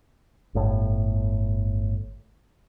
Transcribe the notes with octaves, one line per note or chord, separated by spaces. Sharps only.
G1 A2